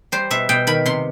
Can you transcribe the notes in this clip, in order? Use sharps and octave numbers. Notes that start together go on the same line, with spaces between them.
G3 C5
B2 E5
B2 G5
D#3 B5
C3 C6